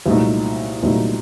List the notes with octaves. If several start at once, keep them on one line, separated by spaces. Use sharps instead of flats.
C2 A#2 F#3 A3 D#4
C2 A#2 F#3 A3 D#4